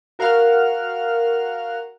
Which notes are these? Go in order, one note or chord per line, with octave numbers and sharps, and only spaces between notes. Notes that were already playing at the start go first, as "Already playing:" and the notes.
F#4 A#4 F5 F#5 F6